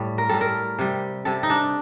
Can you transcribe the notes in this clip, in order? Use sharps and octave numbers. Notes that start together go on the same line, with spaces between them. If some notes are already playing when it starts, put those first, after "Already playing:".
Already playing: A2 G3
A#4
A2 G3 A4
A#4
C3 G3
C3 G3 A4
D#4
D4